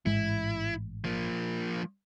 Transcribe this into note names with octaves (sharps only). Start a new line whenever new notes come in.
A1 G#2 G#3 E4
F3 A#3